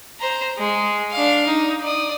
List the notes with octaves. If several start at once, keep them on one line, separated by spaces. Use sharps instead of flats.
C5 A#5
G#3
D4 F5
D#4
D5 D#6